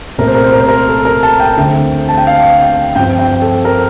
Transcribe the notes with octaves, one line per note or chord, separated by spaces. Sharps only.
C2 A#2 A3 C4 A#4
C5
A#4
C5
A#4
C5
A#4
A4
A#4
A5
G5
D2 D3 A3 C4
A5
G5
F5
G5
G2 F3 C4 G5
G5
A4
A#4